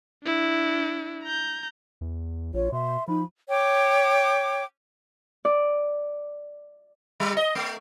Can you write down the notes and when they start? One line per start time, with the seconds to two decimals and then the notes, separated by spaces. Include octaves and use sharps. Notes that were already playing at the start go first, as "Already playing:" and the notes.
0.25 D4 E4
1.24 A#5 G6
2.01 E2
2.54 A#1 F4 C#5
2.72 B2 E5 C6
3.08 F3 D#4 B5
3.49 C#5 G5 D6
5.45 D5
7.20 G3
7.37 D#5
7.55 A3